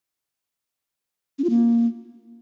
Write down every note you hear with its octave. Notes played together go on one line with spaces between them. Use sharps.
C#4
F4
A#3